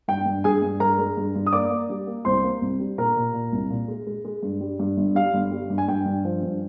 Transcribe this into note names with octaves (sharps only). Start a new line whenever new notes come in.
G2 G5
G2
G2 G#4 G#5
G2
G2 A#4 A#5
G#3
G2
G2
D#6
A#3 D5 D6
A#3
G3
A#3
C2 C5 C6
A#3
C2
G3
A#2 A#4 A#5
A#2
A#2
C2
A#2
G#3
G#3
G#3
G2
G3
G2
G1
G3 F5
G1
G3
G2
G#5
G2 G5
G2
F3
G2